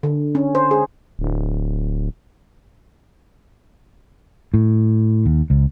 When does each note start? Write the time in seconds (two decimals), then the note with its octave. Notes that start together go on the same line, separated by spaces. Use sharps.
0.03 D3
0.35 C#4
0.55 C5
0.71 G#4
1.19 D1
4.54 A2
5.26 D#2
5.50 C#2